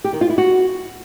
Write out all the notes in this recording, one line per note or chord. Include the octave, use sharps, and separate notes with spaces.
G4
D#3
F4
E4
F#4